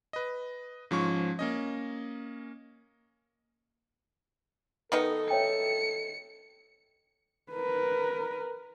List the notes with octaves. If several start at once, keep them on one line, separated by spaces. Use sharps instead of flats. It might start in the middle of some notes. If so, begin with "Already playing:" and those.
B4 D#5
G#2 F3 C#4 C#6
A#3 C#4 D#5
D#3 B3 D#4 A4
C#5 E5 G5 C#7
A#4 B4